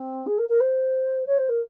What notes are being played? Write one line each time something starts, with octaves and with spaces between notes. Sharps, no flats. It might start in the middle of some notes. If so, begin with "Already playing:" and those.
Already playing: C4
G#4
A#4
A#4
C5
C#5
C5
A#4